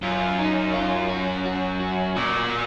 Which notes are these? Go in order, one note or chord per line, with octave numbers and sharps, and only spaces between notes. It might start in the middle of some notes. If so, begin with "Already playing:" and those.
F#2 F4
D#4
F4
F#4
F#4
F#4
A#2 F#4